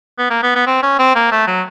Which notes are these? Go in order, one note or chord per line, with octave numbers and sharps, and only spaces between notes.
B3
A#3
B3
B3
C4
C#4
C4
A#3
A3
F#3